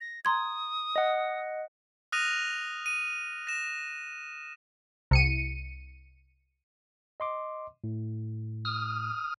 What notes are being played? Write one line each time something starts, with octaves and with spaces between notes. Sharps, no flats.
A#6
A#5 C6 D#6 G#6
D#5 F#5
D#6 F6 F#6 A#6 D#7 F7
D#7
A#6 E7
C2 C#7 D#7
D#5 C6 D6
A2
D#6 F6